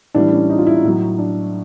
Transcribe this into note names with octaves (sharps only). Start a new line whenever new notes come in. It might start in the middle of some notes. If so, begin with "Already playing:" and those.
A2 E3 G3 D4
C#4
D#4
F4
E4
D#4
A2 F#3
D4